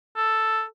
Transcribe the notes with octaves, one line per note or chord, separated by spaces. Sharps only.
A4